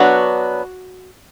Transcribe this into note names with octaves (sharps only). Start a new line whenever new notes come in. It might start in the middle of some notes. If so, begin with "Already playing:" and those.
Already playing: F#3 B3 D4 F#4